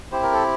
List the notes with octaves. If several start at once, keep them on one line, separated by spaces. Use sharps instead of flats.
C4 E4 G4 C5
A#4
A4